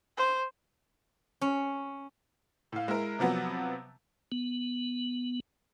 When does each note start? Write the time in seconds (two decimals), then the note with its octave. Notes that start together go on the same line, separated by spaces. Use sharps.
0.17 C5
1.41 C#4
2.72 A2 F5
2.88 G#3 E4 A#4
3.19 C3 F3 F#3 B3
4.32 B3